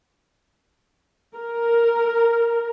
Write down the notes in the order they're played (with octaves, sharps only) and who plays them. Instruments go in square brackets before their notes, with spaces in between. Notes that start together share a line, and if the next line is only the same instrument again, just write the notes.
[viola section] A#4